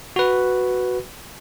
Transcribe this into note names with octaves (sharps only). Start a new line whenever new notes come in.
F#4 B4